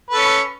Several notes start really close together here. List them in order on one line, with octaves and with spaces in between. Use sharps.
B4 A4 C#4